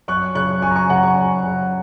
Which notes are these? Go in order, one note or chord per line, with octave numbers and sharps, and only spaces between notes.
F#2 C#6 F#6
C#3 C#6 F#6
F#2 G#5 C#6
A#5
G#5 C#6
C#3 F#5 A#5
G#5 C#6
F#2
C#3